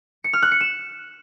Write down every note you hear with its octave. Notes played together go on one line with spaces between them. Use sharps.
C#7
F6
F#6
C#7
E7